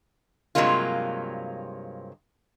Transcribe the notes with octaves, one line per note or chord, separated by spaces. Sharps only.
G2 C3 F#3 G#3 A#3 F4